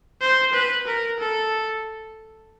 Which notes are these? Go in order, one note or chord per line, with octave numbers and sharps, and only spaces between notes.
C5
B4
A#4
A4